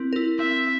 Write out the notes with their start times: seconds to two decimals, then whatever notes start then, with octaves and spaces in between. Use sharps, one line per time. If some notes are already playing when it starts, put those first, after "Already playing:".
Already playing: C4 E4 A#4
0.13 E4 A#4
0.39 C4 E5